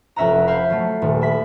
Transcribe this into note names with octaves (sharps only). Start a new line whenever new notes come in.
F1 C#4 E5 F#5 A#5
E5 F5 B5 G6 C7
F#3 A3
D#1
E5 B5 B6